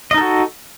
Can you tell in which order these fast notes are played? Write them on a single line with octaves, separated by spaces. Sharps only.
D#5 D#4 A4 F#4